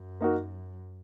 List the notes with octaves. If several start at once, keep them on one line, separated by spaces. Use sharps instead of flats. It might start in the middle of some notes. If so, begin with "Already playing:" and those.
Already playing: F#2
A#3 D#4 F#4 A#4